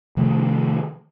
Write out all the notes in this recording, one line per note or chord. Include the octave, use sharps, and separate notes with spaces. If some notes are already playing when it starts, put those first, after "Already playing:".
C3 D#3 F3 A3